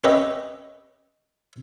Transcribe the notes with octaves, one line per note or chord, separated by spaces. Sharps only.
C#4 G4 B4 D#5 E5